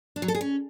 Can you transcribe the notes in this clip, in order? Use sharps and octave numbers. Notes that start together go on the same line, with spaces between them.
D4
F#3
A4
G#4
C#4